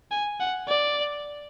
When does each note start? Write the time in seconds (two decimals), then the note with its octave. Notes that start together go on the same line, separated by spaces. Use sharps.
0.11 G#5
0.40 F#5
0.68 D5